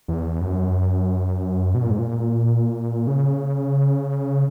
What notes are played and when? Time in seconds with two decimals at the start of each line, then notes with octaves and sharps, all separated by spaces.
0.08 E2
0.41 F#2
1.75 B2
1.82 A#2
1.90 G#2
1.99 A#2
3.07 C#3